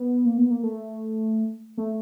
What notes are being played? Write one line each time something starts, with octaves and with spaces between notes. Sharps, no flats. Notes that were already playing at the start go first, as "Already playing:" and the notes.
Already playing: B3
A#3
B3
A#3
A3
A3